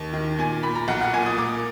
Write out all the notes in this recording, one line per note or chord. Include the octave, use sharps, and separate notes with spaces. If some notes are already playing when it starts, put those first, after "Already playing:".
Already playing: D#2
D#3
A#2 G#5
A#2 B5
A#5
B1 F#5
F#5
A#2 G#5
D#6
A#3 D6